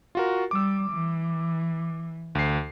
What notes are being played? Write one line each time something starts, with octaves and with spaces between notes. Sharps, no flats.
F4 F#4 A#4
G3 D6 E6
E3
D2 C7